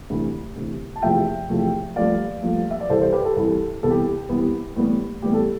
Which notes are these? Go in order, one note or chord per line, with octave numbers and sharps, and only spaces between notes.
D2 C3 E3
D2 C3 E3
A5
E2 C3 F3 A3 E5 G5
E2 C3 F3 A3
G2 F3 A3 D5 F5
G2 F3 A3
E5
D5
C2 C3 E3 A4 C5
A4 C5
G4 B4
A4
C2 C3 E3
C2 C3 E3 B3 A4
G4
G4
C2 C3 E3 B3
A2 E3 G3 B3
A2 E3 G3 B3 G4
A4